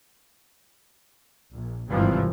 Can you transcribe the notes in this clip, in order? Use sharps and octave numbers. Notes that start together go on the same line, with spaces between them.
A#1
G#1 G2 C3 E3 F3